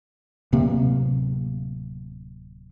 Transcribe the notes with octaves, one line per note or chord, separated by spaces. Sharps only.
D1 C3 A#3